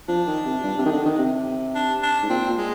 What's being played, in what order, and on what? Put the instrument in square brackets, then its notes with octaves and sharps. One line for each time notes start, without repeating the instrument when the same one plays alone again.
[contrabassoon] F3 [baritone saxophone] D4
[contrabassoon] D#3
C3
G2
C3
D#3
D3
D#3
C3
[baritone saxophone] D4
D4
[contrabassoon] G#2
[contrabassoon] A#2 [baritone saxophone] C4
[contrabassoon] A#2
[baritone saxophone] G#3